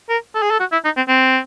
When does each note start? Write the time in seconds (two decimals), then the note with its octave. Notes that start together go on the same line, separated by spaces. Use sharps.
0.10 A#4
0.35 A4
0.42 G#4
0.51 A4
0.60 F#4
0.72 E4
0.85 D#4
0.97 C4
1.08 C4